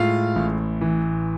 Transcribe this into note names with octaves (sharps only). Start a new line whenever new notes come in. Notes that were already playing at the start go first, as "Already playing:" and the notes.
Already playing: A2 G#3 F4 F5
A1
E3